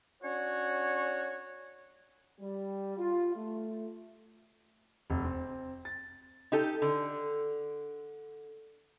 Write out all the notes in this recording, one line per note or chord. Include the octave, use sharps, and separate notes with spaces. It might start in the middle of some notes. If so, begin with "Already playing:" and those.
C#4 D4 F#4 C#5
G3
F4
A3
F1
C4
A6
D#4 G4 A4
D3